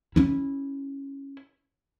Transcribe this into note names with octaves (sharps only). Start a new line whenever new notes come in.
C#4 E4